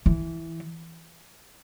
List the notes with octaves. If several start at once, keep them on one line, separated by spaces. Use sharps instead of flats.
E3